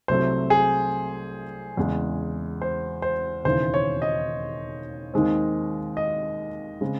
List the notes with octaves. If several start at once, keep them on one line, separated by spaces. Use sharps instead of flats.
C2 C3 F#3 A3 C4 C5
G#4
E2 C#3 G#3
C5
C5
E1 D#2 C#3 E3 C5
C#5
D#5
D#2 D#3 G#3 C4
D#5
C#3 G#3 C4